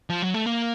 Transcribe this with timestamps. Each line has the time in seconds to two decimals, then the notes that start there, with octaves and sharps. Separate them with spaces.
0.10 F3
0.22 F#3
0.34 A3
0.46 A#3